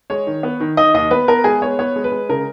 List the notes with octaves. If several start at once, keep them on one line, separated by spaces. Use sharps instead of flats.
G#3 C#5
D#3
B3
D#3
D#3 D#5
D#2 D#5
B3 B4
B3 A#4
G#3 G#4
B3 C#5
B3 C#5
G#3
B4
G#3
C#3 A#4